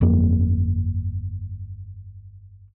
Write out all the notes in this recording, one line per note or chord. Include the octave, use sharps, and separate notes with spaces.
G1 F2 A#3